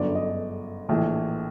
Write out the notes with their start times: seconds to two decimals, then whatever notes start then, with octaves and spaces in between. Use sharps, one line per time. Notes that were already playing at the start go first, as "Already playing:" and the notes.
Already playing: G1 F#2 D3 D5
0.15 D#5
0.89 A#1 A2 E3